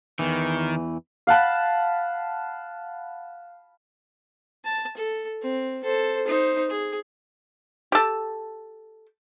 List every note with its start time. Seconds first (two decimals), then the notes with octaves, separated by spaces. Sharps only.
0.19 E2 D#3 E3
1.27 F5 F#5 A5 B5
4.65 A5
4.97 A4
5.42 C4
5.84 A4 C5
6.27 D#4 C5
6.70 G#4
7.92 G4 A4